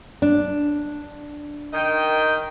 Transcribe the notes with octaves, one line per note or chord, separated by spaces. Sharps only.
D4
D#3 D#5 G5